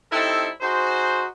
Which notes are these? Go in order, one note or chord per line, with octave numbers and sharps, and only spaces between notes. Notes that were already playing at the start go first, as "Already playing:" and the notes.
G3 C4 D#4 E4 A4
D#4 F#4 G#4 C5